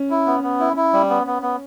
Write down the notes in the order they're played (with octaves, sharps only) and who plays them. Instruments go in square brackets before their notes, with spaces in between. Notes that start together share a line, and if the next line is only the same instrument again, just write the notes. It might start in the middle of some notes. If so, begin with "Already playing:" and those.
Already playing: [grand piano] C#4
[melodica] E4
B3
B3
E4
E4
G3
B3
B3
B3